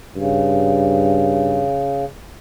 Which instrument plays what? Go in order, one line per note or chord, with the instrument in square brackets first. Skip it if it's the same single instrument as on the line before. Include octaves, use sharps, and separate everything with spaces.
[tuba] G2 [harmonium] C#3